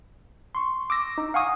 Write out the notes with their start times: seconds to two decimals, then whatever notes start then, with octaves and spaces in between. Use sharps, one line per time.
0.55 C6 C#6
0.90 D6 E6 A#6
1.18 D#4
1.34 F5 F#5 G#5 C#6 D#6